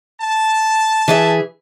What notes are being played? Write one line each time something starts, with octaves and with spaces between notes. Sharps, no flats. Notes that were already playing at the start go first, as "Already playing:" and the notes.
A5
E3 G#4 E5